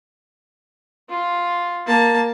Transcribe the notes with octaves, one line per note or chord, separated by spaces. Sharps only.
F4
A#3 A5